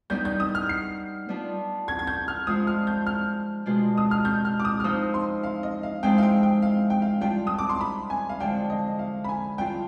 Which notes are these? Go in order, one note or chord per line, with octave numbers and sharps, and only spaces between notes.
G3 B3 D#4 G6
G6
D#6
F6
C7
G3 B3 D4 F4
G#6
G#6
G6
F6
F3 G#3 D4 F4 D#6
F6
G6
F6
B2 G#3 D4 F4
D#6
F6
G6
F6
D6
D#6
F6
F3 C4 D#4 D#6
C6
F5
D#5
F5
F3 G#3 C4 D#4 G5
F5
G5
G5
F5
G5
F5
G3 D4 F4 G5
D#6
D6
C6
B5
G#5
F5
D3 F3 G#3 G5
D#5
F5
B5
G#5
G3 D4 F4 G5